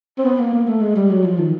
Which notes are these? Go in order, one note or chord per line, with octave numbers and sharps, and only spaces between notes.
C4
B3
A#3
A#3
A3
G#3
G3
F#3
F3
D#3